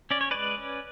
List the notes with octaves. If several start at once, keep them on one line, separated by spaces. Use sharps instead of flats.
C#4 D5
C#5
G#3 B4 D5
C#4